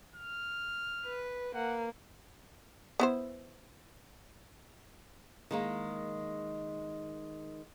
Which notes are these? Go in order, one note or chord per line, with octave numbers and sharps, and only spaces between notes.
F6
B4
A#3 F#5
B3 E4 C5
D#3 G#3 A#3